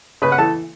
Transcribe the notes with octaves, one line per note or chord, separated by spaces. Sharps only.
C#3 B4 B5
F#5
E3 A4 A5